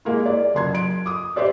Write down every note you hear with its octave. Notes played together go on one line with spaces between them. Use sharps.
G#3 A#3 E4
D5
F#1 C6 G#6
D7
D6 D#6
G4 C5 D5 E5